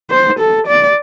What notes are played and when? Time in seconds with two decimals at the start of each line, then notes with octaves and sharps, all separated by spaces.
0.10 C5
0.39 A4
0.67 D5